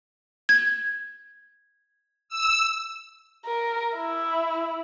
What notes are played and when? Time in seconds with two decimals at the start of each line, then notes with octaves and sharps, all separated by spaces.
0.49 G#6
2.29 E6
3.46 A#4
3.97 E4